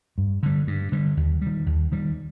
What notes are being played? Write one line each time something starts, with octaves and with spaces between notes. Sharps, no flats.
G2
D3 G3
G2
D3 G3
D#2
D#3 G3
D#2
D#3 G3